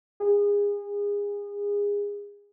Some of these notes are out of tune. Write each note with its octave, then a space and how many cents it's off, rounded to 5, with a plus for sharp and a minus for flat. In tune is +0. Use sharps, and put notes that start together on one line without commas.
G#4 -30